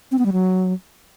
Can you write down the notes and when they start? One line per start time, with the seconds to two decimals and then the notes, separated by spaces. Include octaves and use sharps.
0.12 C4
0.19 B3
0.26 G3
0.33 F#3